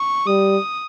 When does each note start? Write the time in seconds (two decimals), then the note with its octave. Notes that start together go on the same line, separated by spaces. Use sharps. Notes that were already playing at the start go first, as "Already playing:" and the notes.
Already playing: C#6
0.27 G3 D#6